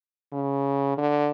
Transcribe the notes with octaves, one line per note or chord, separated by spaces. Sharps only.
C#3
D3